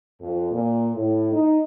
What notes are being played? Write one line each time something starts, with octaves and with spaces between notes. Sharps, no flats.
F2
A#2
A2
D#4